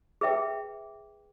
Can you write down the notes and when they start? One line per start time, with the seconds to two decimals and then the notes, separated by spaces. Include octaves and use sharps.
0.21 G#4 B4 E5 G5